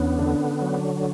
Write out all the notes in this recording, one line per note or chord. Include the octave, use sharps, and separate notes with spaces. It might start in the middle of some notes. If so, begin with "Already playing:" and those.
Already playing: E2 B3 C#4 D4
D3 D4
F#3